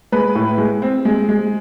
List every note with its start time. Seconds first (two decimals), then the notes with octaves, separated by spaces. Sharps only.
0.12 G#3 B4
0.35 A2
0.58 G#3
0.82 C4
1.05 G#3
1.29 G#3